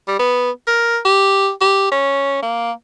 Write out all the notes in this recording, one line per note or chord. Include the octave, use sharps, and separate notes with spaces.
G3
B3
A#4
G4
G4
C#4
A#3